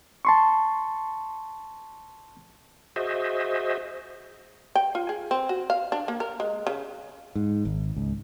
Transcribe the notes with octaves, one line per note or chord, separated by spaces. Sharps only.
A5 C6 C#6
F#4 G#4 C5 D#5 E5
G5
F4
G#4
C4
F#4
F5
D4
A#3
A#4
G#3
C#3
G#2
G#1
C#2